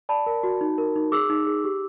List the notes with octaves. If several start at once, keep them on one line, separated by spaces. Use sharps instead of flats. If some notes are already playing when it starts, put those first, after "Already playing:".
D5 A5 B5
A#4
F#4
D#4
A#4
D#4
G#4 D6 E6
D#4
G#4
G4